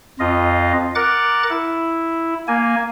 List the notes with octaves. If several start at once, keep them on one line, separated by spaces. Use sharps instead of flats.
F2 F4 D#5
A#4 F#5 D6 F#6 A6
E4
A#3 G#5